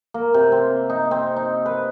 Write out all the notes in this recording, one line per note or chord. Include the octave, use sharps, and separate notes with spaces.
A#3
C3
C4
D#4
C4
D#4
B4